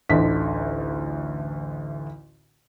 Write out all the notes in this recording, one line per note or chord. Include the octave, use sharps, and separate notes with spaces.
A1 D2 D3 D#4 B6